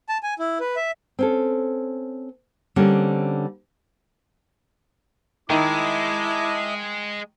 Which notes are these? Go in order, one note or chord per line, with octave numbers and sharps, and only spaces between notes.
A5
G#5
E4
B4
E5
C4 C#4 A4
D3 G3 A#3 C4 C#4
D#3 G#3 E4 D#5 E5 A5 D6